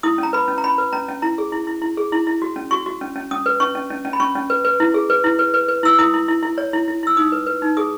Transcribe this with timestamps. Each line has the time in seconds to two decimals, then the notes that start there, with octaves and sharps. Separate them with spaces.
0.03 E4 D#6
0.18 C#4 A#5
0.33 B4 B5
0.48 C#4
0.58 A#5
0.64 C#4 B5
0.78 B4
0.93 C#4 A#5
1.08 C#4
1.22 E4 A#5
1.38 G#4
1.52 E4
1.67 E4
1.82 E4
1.97 G#4
2.12 E4
2.27 E4
2.42 F#4
2.56 C#4
2.71 F#4 C#6
2.86 F#4
3.01 C#4
3.16 C#4
3.31 C#4 D#6
3.46 B4
3.60 C#4 C#6
3.75 C#4
3.90 C#4
4.05 C#4
4.13 B5
4.20 C#4 C#6
4.35 C#4
4.50 B4
4.65 B4
4.80 E4
4.94 G#4
5.10 B4
5.24 E4
5.39 B4
5.54 B4
5.68 B4
5.83 E4 E6
5.99 E4 D#6
6.14 E4
6.28 E4
6.42 E4
6.58 C#5
6.73 E4
6.88 E4
7.03 E4 E6
7.17 D#4 D#6
7.32 B4
7.47 B4
7.62 D#4
7.77 G#4 D#6